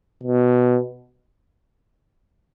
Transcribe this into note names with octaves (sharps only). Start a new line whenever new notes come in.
B2